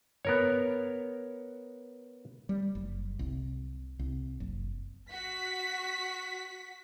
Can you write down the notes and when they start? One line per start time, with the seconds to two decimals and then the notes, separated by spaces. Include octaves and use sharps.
0.25 B3 A#4 C#5
2.49 G3
2.75 F#1
3.19 C2
3.99 C2
4.40 F#1
5.10 F#4 B6